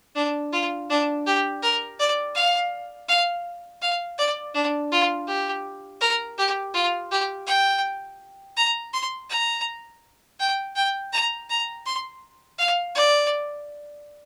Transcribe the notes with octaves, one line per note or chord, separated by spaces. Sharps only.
D4
F4
D4
G4
A#4
D5
F5
F5
F5
D5
D4
F4
G4
A#4
G4
F4
G4
G5
A#5
C6
A#5
G5
G5
A#5
A#5
C6
F5
D5